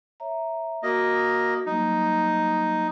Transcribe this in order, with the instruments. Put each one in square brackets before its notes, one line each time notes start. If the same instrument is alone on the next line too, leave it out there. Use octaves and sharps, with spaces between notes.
[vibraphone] C#5 E5 A#5
[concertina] A#3 D#5 [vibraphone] F#4
[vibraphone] F#3 G3 A#3 [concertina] D#4